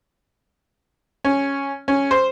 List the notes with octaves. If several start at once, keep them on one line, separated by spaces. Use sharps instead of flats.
C#4
C#4
C5